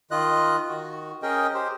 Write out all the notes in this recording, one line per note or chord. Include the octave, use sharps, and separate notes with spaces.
D#3 F4 D#5 F#6
D#3 F#4
C#4 G#4 A#4 D#5 G5
G4 C5